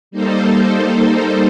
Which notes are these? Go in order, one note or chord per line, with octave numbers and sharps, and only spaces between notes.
G3 A#3 D#4 A4 C5